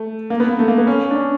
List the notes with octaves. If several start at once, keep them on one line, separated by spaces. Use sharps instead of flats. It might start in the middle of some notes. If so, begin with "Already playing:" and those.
Already playing: A3
A#3
B3
A#3
A3
A#3
B3
C#4
D4
C#4